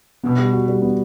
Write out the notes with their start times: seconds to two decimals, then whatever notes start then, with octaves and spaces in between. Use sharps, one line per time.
0.23 B2 B3
0.38 G3
0.53 F#4
0.68 G3
0.82 B3